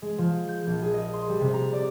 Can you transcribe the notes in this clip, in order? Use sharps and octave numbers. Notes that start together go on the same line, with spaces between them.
G#3
F3
G6
A#1
G#4
D#5
C6
G3
C3
A#5
D5